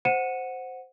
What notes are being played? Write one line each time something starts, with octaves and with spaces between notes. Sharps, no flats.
C5 F#5 C#7 D#7 E7